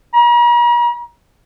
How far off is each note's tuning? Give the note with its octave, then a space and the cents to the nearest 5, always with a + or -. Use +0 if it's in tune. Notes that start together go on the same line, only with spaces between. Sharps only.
A#5 +45